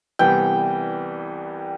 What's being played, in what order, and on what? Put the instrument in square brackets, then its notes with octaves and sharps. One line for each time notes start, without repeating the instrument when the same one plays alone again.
[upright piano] C2 C3 E3 G3 B3 [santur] G5